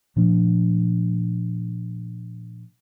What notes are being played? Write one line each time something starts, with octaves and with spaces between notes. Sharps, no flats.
A#2 F3 A3 D4